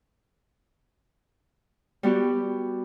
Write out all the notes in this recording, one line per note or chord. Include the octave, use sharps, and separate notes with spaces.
G3 B3 F#4 G4